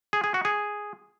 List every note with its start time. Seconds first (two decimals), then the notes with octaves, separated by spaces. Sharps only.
0.13 G#4
0.24 G#4
0.34 F#4
0.45 G#4